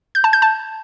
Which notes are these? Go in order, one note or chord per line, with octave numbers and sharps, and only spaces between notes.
G6
A5
G6
A5